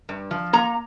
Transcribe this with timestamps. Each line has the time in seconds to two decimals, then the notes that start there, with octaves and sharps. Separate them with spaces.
0.09 G2
0.31 F3
0.53 A#3 A#5